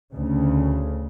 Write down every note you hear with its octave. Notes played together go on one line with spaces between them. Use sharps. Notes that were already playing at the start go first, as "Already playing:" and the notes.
D2 C#3